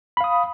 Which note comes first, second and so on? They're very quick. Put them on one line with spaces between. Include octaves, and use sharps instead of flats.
B5 F5 D#6